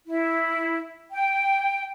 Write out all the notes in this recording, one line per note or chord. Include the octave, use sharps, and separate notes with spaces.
E4
G5